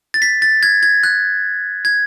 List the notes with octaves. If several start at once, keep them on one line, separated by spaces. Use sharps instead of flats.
A6
B6
A6
G#6
G#6
F#6
G#6